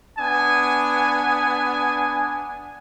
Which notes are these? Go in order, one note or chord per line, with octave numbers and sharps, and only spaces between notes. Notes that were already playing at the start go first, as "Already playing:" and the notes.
B3 D4 G#5 D#6